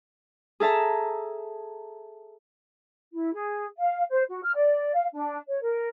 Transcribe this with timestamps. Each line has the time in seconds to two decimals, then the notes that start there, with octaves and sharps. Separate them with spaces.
0.60 G#4 A4 E5 A5 A#5
3.12 E4
3.32 G#4
3.78 F5
4.10 C5
4.29 F#4
4.43 F6
4.55 D5
4.93 F5
5.14 D4
5.47 C#5
5.61 A#4